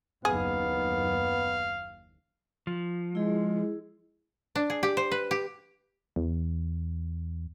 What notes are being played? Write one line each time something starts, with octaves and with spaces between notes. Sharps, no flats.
F#1 D#2 B3 G#4 F5
F3
G#3 E4 G#4
D4
G#4
G4
C5
B4
G4
E2